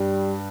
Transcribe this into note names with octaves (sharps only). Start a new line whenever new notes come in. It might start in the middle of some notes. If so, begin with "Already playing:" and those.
Already playing: G2 G3